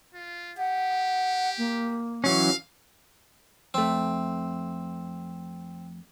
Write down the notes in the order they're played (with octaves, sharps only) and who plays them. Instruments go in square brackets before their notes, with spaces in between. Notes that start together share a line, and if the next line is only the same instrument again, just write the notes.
[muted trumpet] F4
[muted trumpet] G4 [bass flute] F#5
[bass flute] A#3
[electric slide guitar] E3 F#3 C#4 [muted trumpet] F5
[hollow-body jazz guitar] F2 A3 [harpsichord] C4